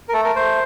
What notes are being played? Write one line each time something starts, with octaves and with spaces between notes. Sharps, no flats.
A#4
A3 A4
A#4
A3 C5